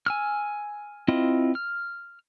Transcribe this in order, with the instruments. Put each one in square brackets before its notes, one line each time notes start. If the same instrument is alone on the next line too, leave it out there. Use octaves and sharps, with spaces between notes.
[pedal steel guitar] G#5 E6 F6
C4 E4 F4 D#5
F6